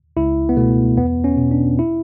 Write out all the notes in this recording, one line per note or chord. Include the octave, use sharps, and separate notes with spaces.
C#2 E4
B3
B2 A3
E2 B3
C#4
B2
D4
E4